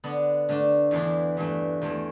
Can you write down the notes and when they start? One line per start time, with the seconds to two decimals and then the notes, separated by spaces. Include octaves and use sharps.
0.04 D3 B3 D4
0.49 D3 A3 D4
0.91 E2 E3 B3 D4
1.37 G2 E3 A3
1.82 E2 E3 A3